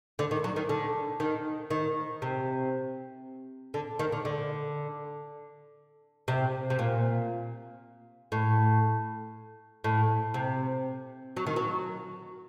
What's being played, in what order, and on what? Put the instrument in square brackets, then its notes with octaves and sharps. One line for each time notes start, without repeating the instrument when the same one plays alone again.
[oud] D3
D#3
F#3
D#3
D3
D#3
D#3
C3
D3
D#3
D3
D3
C3
C3
A#2
A2
A2
C3
F#3
D#3
F#3